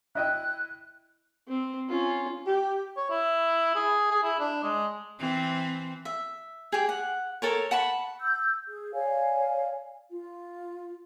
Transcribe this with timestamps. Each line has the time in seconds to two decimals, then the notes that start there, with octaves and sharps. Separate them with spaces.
0.15 E4 D#5 G5 F#6
1.48 C4
1.89 C#4 F4
2.46 G4
2.97 C#5
3.10 E4
3.75 G#4
4.11 G#4
4.23 E4
4.40 D4
4.63 G#3
5.19 E3 C4
6.05 E5
6.72 G4 G#4
6.89 F#5
7.42 A4 A#4 C#5
7.71 F#5 A5 B5 C#6
8.21 E6 G6
8.68 G#4
8.93 C#5 D5 F5 G#5
10.09 F4